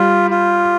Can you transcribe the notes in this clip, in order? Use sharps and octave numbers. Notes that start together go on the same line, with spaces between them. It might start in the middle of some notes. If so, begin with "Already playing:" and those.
Already playing: G3 F4
F4